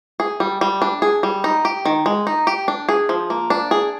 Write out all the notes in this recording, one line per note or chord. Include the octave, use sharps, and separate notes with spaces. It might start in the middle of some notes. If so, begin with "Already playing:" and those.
G#4
G3
G3
D4
G#4
G3
D#4
G4
D#3
G#3
D#4
G4
D4
G#4
F3
A#3
D4
G#4